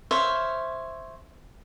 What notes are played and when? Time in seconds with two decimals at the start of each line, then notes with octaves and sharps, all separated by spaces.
0.11 C5 C#5 E5 F5